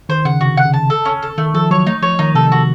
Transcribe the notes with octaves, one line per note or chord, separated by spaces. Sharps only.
D#3 C5
C#3 F#5
C3 F#4
F#5
C#3
A5
A4
C#4
A4
D#3 A3
F3 A4
F#3 C#5
A3 D#4
F3 C#5
D#3 D#4
C3 A4
F#4